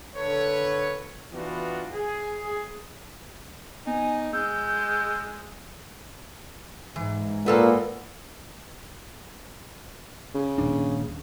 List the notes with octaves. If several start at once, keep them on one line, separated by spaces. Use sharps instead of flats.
D3 A4 B4 C#5
E3 B3 D4 F4 F#4
G#4
B3 D#4 G#5
G#3 E6 G6
G#2 E3
A#2 A#3 B3 A4 B4
C#3
D#1 D4